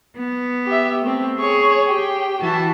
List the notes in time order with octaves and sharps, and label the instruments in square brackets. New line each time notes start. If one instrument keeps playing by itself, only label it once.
[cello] B3
[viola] G4 E5
A3 C4
[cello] G#4 [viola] C#5 C#6
[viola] G4 G5
[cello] E3 E4 [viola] F#4 A5